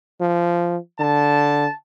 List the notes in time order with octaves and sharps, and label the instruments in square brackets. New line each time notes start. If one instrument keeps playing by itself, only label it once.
[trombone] F3
[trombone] D3 [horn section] A5